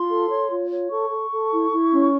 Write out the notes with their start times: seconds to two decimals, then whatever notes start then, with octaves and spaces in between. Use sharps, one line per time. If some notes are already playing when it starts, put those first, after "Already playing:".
Already playing: F4 C6
0.09 A4
0.30 C#5
0.50 F4
0.70 C#5
0.90 A4 C#6
1.10 A4
1.31 A4
1.51 E4
1.71 E4
1.91 C#4